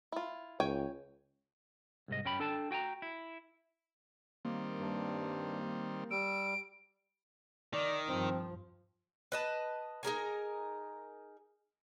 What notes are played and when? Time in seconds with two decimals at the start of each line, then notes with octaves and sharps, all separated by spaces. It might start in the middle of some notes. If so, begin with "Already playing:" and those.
0.12 E4 F4
0.60 C#2 C#5 G5 G#5
2.08 C2 G#2 D#5
2.25 F#2 C#4 G5 B5
2.40 D4 A4 G5 A5
2.71 F#4 G5 G#5 A#5
3.02 E4
4.45 D#3 G3 A#3 C4
4.79 G2
6.11 G3 E6 D7
7.73 D#3 D5
8.08 G2 F3 C4
9.32 B4 D#5 A5
10.03 D#4 G#4 A#4 G#5